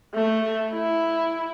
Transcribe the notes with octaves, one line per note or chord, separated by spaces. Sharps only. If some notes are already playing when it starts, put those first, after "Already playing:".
A3
E4